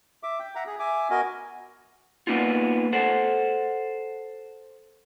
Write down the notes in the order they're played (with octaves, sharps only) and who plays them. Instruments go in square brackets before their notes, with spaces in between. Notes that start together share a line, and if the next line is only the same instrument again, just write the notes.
[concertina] E5 D6
G5
E5 F#5 A#5
G#4
E5 G#5 D6
B3 F#4 A#4 D#5 G#5
[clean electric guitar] A#3 B3 D#4 F4
A4 C5 F#5